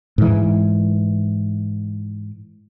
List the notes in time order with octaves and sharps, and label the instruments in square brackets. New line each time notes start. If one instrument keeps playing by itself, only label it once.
[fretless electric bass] G#2 E3